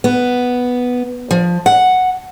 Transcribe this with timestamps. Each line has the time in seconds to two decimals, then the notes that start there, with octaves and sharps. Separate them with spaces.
0.04 B3
1.31 F3
1.66 F#5